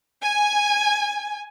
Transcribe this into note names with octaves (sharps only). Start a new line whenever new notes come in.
G#5